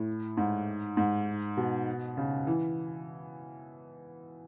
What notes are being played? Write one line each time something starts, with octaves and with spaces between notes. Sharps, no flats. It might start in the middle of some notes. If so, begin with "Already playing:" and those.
Already playing: A2
G#2
G#2
B2
C#3
E3